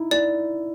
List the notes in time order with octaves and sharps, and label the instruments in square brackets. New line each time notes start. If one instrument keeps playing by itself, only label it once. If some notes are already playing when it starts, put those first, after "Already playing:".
Already playing: [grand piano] D#4 E4
[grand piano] E4 [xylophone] D5